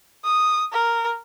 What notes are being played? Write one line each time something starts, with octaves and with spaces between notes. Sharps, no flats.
D#6
A#4